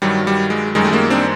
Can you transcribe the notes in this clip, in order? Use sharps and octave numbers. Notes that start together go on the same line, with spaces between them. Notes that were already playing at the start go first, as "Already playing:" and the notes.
G2 D#3 F#3 G3
G3
G#3
F#2 D#3 G3 G#3
A3
G#3 A#3
C4 D4